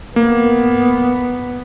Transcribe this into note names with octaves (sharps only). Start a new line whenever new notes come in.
A#3 B3